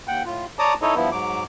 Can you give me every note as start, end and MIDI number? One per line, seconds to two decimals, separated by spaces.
0.08 0.23 39
0.08 0.23 78
0.08 0.23 79
0.26 0.46 45
0.26 0.46 65
0.59 0.74 73
0.59 0.74 74
0.59 0.74 81
0.59 0.74 82
0.59 0.74 86
0.59 0.74 87
0.82 0.95 63
0.82 0.95 64
0.82 0.95 69
0.82 0.95 73
0.82 0.95 75
0.95 1.10 43
0.95 1.10 53
0.95 1.10 59
0.95 1.10 64
1.12 1.44 44
1.12 1.44 54
1.12 1.44 86